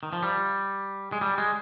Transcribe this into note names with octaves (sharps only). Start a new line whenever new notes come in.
D#3
F3
G3
G#3
G3
G#3